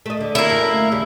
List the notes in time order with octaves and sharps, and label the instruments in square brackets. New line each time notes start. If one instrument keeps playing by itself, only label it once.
[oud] A3 D#5
D2 D3
[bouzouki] A#3 E4
[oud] F#2 A3
D#2 C#3 G3